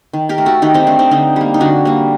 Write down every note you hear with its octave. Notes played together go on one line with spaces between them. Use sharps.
D#3
G4 A#4
A3
F#4 A4
D#3 D#4 G4
C4 D#4
A3 D4
C4 D#4
D3 C4 D#4
G3 A#3
D#4
D3 D4 F#4
G3 A#3